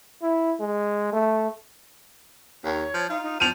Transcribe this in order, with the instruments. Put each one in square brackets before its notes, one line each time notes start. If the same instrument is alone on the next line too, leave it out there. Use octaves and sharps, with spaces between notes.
[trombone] E4
G#3
A3
[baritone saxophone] D#2 [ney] C#5
[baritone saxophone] F3
[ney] D#4 [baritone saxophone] F4
[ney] D#4
[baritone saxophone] F3 [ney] C5 [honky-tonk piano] D#7 F7